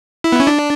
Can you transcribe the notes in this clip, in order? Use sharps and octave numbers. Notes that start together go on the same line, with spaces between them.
E4
B3
C#4
D4